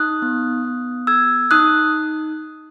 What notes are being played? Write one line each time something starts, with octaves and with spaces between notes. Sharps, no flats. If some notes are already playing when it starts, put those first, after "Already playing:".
Already playing: D#4 D#6 F#6
B3
B3
G#4 E6 G#6
D#4 D#6 F#6